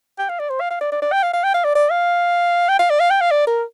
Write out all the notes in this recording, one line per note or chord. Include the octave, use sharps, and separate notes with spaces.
G5
F5
D5
C5
F5
F5
D5
D5
D5
G5
F5
F5
G5
F5
D5
D5
F5
G5
F5
D5
F5
G5
F5
D5
A#4